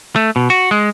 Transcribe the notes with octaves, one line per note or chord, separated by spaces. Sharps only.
A3
B2
F#4
G#3